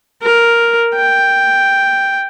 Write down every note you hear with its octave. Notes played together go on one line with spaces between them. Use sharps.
A#4
G5